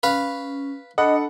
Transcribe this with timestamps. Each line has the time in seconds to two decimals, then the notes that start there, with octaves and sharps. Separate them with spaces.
0.03 C#4 B4 F5
0.98 D4 A4 D#5 F#5 B5